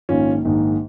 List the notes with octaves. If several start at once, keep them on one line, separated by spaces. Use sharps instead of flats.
A#1 G#2 D#3 C#4 F4
A#1 G#2 D#3